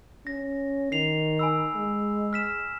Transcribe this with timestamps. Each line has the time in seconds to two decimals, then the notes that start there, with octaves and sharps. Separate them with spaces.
0.27 C#4 A#6
0.92 D#3 C7 F7
1.39 G#5 B5 E6
1.75 G#3
2.33 F6 B6 E7